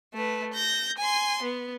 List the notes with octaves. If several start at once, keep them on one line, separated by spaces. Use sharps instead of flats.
A3 B4
G6 A#6
G#5 C6
B3